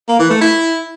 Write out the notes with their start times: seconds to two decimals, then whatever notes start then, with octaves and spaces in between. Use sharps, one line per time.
0.08 A#3
0.19 E3
0.30 A3
0.41 E4